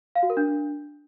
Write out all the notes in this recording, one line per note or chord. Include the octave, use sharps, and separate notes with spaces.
F5
F#4
A#4
D4